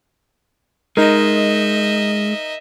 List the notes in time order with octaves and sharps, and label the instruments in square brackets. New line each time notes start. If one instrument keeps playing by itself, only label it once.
[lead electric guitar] G#3 [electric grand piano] D#4 A#4 [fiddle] D#5 E5